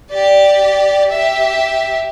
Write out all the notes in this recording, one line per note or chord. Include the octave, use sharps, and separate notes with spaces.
G4 D5
G4 E5